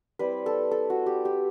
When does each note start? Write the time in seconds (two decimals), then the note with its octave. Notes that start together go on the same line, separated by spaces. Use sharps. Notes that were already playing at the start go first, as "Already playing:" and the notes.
0.19 G3 C4 E4 B4
0.46 A4
0.71 A4
0.90 F#4
1.06 G4
1.25 G4